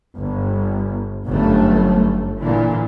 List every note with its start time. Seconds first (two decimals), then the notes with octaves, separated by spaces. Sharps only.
0.15 G1
1.27 G1 F#2 A3
2.39 A#2 D3 E3